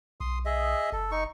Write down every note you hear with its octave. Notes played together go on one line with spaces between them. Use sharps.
B1 C6 D#6
G#4 D#5 E5
F#1 A4
D#4 C#6